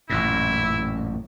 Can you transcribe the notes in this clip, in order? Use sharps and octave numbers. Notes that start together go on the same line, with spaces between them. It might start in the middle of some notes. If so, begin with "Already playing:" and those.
A1 F#2 A#2 E4